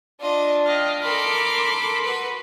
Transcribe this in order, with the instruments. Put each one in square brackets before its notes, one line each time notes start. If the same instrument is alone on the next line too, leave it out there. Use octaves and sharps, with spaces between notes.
[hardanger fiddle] D4 [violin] F4 D#5
[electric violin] D#5 F5 [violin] G5
[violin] A4 D6 [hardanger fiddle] A#4 [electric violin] B5 C6
[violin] F#4 B4